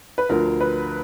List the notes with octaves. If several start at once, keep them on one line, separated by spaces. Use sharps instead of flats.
B4
D2 D3 F3 A#4
B4